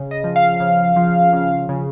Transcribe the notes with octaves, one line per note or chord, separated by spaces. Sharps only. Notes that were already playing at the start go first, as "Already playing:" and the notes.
Already playing: C#3
D#5
F3
F5
C#3
F3
C#3
C#3